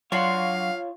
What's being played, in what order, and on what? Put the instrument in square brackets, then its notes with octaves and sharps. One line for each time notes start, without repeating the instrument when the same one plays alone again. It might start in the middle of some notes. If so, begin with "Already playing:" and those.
[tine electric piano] F#3 C7 [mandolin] D4 F#4 C6 [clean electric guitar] F4 C#5 [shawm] F5